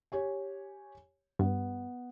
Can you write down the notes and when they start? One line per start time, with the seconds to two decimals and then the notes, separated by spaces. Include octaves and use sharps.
0.12 G4 C#5 G#5
1.39 G2 B3